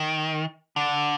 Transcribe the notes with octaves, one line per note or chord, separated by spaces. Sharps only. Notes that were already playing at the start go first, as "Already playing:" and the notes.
Already playing: D#3
D3